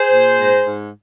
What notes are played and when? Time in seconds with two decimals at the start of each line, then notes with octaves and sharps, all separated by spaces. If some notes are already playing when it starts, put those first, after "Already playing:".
Already playing: G#4 C5
0.12 A#2
0.39 G#2
0.67 G#2